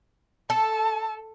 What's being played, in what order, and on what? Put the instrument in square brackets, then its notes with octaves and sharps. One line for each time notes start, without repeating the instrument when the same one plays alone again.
[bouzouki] A4 [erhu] A5